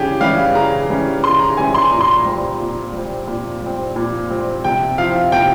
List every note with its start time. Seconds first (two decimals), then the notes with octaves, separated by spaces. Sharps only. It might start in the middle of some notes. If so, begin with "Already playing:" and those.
Already playing: C#3 E3 G3 C#4 E4 G4 G#4
0.21 E3 G3 C#4 E4 F5
0.54 C#3 A#5
0.90 E3 G3 C#4 E4
1.23 C#3 C6
1.40 A#5
1.57 E3 G3 C#4 E4 G#5
1.74 C6
1.92 A#2 A#5
2.01 C6
2.10 A#5
2.25 G3 C4
2.60 A#2
2.93 G3 C4
3.27 A#2
3.62 G3 C4
3.96 A#2
4.30 G3 C4
4.64 C3 G5
4.98 F3 C4 E4 F5
5.32 C3 G5